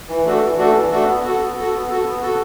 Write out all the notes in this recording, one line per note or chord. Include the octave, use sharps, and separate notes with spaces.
E3
A3 D4 F#4 A4
E3
A3 D4 F#4 A4
E3
A3 D4 F#4 A4
B3
F#4 A4
B3
A4
F#4
B3
F#4 A4
B3
F#4 A4